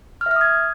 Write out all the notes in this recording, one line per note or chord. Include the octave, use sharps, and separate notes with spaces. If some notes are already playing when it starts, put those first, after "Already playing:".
F6
E5
F6
D#6
G#6